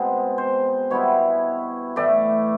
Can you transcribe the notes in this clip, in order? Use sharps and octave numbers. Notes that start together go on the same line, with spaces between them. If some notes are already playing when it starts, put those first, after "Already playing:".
Already playing: B2 G#3 C4
C5
B2 G3 B3 E4 C#5
A2 E3 A3 D5